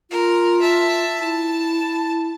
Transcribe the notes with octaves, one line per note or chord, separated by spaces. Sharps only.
F4 A#4
E5 A5
E4 A5